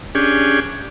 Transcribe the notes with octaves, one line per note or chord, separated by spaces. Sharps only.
C#4 D4 G4 G#4